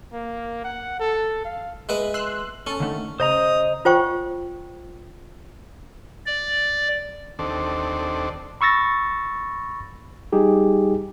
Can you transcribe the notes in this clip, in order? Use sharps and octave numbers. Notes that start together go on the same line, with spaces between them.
A#3
F#5
A4
F5
G#3 B4 E5
C6 E6 F#6
C#4 A4
D3 D#3 A3
C#3 C5 D#5 A#5 D#6
F4 C5 G5 C#6
D5
D#2 C4 D4 A4
B5 C#6 E6 A6 A#6
G3 D#4 G4 G#4